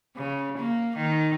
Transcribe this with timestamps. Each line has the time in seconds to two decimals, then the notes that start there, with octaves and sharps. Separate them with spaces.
0.17 C#3
0.57 A#3
0.97 D#3